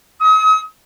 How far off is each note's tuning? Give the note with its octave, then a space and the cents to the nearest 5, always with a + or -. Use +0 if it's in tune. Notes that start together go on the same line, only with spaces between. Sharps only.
D#6 +40